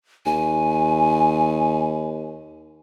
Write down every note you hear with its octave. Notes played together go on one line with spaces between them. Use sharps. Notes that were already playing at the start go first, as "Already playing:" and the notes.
D#2 G#5